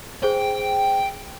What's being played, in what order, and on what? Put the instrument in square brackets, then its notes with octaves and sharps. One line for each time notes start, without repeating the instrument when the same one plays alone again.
[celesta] G#4 C5 [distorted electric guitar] G5